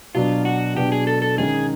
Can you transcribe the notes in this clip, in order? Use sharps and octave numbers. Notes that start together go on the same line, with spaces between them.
B2 F#3 B3 D4 F4
F#4
B2 F#3 B3 D4 G4
G#4
A4
A4
D#3 G#3 C#4 G#4